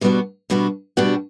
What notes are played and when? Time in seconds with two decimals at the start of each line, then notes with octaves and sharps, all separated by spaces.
0.01 B2 G3 B3 D4 F#4
0.50 B2 G3 B3 D4 F#4
0.97 B2 G3 B3 D4 F#4